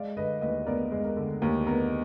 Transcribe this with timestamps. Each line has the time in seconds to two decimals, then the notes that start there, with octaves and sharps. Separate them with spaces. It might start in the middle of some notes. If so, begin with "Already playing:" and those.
Already playing: G#3 D5 F5
0.17 D3 B4 D#5
0.41 D#2 B4 D#5
0.67 B3 A#4 D5
0.92 G#3
1.04 A#4
1.17 D3
1.42 D#2 A#4
1.67 B3 A#4